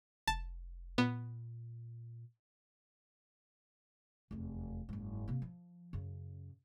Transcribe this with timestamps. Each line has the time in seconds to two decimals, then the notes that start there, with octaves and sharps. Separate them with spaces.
0.27 F1 A5
0.98 A#2 B3
4.31 F1 E2
4.89 F#1 G#2
5.28 C3 A#3
5.42 F3
5.93 F#2 C#3